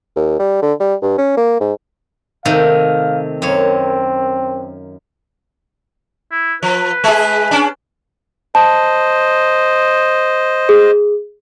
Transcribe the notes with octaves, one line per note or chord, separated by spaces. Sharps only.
D#2
G3
D3
G3
G2
C#4
A#3
G#2
C3 D#3 A3 F5
F#2 A#3 C4 C#5
E4
F3 B4
G#3 G#4
C#4 D4
C5 D#5 A5
G#4